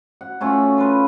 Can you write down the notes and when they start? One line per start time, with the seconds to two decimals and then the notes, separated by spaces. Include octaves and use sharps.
0.21 F#5
0.41 A3 C#4 F4
0.78 F4 B4